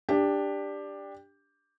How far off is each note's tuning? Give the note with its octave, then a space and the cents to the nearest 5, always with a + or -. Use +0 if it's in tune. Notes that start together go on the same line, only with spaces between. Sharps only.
D4 +0 G4 +15